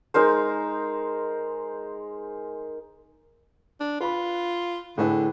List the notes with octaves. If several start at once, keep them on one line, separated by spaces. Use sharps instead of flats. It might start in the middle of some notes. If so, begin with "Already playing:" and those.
G#3 D#4 A#4 C5
D4
F4 B4 B5
A2 D3 G#4 B4